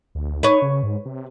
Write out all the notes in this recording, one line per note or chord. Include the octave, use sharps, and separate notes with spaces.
D2
D#4 B4 C#5
C#3
G#2
C3